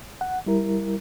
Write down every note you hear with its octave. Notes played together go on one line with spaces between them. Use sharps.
F#5
G3 E4 A#4